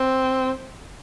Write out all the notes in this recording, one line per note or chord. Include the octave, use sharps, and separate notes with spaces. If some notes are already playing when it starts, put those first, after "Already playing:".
Already playing: C4